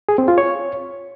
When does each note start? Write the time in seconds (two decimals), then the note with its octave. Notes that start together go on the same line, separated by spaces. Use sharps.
0.09 G#4
0.18 C4
0.28 F4
0.38 C#5